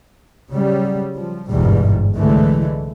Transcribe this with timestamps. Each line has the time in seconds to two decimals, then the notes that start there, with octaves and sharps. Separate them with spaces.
0.51 C#3 F#3 G3
1.16 F3
1.48 G1 E2 G#2 B2 G3
2.16 C2 D3 E3 G#3 A3